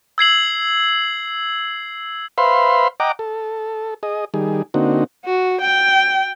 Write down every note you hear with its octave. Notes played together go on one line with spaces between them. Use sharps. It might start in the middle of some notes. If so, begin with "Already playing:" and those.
E6 G#6 C7 F#7
B4 C5 E5 F5 B5 C6
D#5 F#5 G5 A#5 D6
A4
G#4 D#5
D#3 G3 G#4
D3 A#3 C4 D#4 F#4
F#4
G5